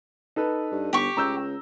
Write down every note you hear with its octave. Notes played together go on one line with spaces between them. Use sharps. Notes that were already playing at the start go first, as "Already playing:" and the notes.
D#4 A4 B4
G2
G1 G4 C#6
C#2 A#5 E6 G6